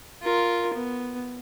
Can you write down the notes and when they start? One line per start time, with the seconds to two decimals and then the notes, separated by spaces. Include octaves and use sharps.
0.22 F4 A#4
0.74 B3